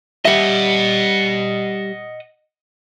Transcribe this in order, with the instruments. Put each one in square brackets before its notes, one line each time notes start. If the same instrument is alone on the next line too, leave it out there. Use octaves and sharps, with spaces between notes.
[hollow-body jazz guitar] G3 E5 [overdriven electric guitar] D#5 F#5